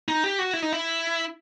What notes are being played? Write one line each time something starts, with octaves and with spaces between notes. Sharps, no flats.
D#4
G4
F#4
E4
D#4
E4